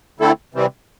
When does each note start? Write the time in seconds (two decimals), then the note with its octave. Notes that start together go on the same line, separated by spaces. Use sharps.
0.19 D3 A3 C4 E4 A4
0.54 C3 E3 G3 C4